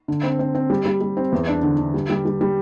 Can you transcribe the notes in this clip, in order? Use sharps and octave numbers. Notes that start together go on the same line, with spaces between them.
D3
C4
C4
C4
G3
G3
G3
C4
E2
D4
D3
D3
G3
G3
G3
G3